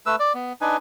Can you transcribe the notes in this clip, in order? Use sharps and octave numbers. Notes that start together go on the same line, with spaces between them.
A3 B4 E6
D5
B3
D4 D#4 B4 G#5